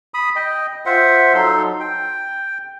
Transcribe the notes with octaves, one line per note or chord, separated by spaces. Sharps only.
B5 D#6
D#5 G5
F4 C5 E5 F#5
F#3 D#4 A4 C6
G5